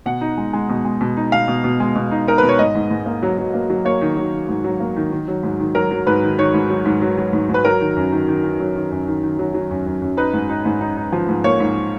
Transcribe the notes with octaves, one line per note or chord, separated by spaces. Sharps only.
B2 F#5
D#4
G#3
G#3
B2
G#3
B2
D#4
B2 F5
B2
B2
G#3
B2
D#4
D#4 A#4
B2 B4
C#5
G#2 D#5
G#2
G#2
A#3
F#3
F#3
A#3
F#3
A#3 C#5
D#3
F#3
D#3
G#2
F#3
A#3
D#3
D#3
F#3
G#2
D#3
F#3 A#4
F#3
G#2 B4
D#3
D#3 C#5
G#2
F#3
G#2
F#3
F#3
G#2
G#2
B4
F#3 A#4
D#3
F#2
D#3
D#3
D#3
F#3
D#3
F#2
D#3
D#3
F#3
F#3
F#2
F#2
F#2
D#4 B4
G#2
D#4
G#2
D#4
D#4
F3
G#2
A#3 C#5
G#2